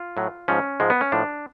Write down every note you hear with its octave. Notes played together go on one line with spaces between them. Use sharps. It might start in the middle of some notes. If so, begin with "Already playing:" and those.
Already playing: F4
A2 F#3
G#2 F3 C#4
G#2 F3 G#3
B3
C#4
A2 F3 D4